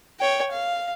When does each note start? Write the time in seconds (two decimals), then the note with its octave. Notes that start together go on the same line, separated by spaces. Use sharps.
0.20 C#5 G5
0.52 F5